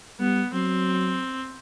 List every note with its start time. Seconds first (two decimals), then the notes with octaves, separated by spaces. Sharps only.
0.20 G3 B3
0.53 F#3 C4